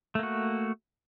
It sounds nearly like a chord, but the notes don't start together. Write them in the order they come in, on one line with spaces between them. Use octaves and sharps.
A3 A#3 F#4